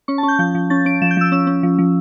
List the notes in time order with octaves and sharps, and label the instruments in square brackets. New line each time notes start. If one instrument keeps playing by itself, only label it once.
[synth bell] C#4 C#6
A5
C#4
G6
F3 G6
F3
C#4 A6
C#4 D7
F3 E7
G6
F3 E6
C#4 E6
C#4
F3
F3